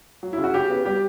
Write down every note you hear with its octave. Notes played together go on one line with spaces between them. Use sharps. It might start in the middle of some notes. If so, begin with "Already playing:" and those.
F#3
E4
C#3
F#4
C#3 G4
B3
G3 G4